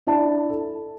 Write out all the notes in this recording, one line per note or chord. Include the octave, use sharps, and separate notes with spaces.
D4 E4 D5 A5
A4